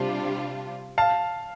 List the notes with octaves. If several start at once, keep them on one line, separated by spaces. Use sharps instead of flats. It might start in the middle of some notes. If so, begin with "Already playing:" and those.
Already playing: C3 G3 D4 F4
F5 A5